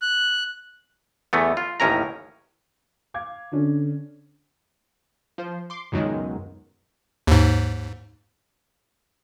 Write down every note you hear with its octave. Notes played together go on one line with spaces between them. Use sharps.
F#6
E2 E3 A3 B3
F4
A1 D#2 A2 C#4 A#4 A#5
F5 D6 G#6
D3 C#4 D4
F3 C5
C6 D6
C#2 F#2 B2 D#3 F#3 G#3
D#2 G#2